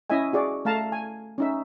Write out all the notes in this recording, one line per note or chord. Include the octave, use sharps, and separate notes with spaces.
C#4 E4 D#5 E5 G#5
F#4 G#4 D5
A3 F5 A5 A#5
G#5
C#4 D#4 E5